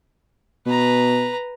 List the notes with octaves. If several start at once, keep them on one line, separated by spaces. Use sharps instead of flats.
B2 B4 A#5